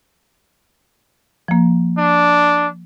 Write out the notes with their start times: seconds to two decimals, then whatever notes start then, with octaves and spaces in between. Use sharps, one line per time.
1.48 F3 A#3
1.98 D4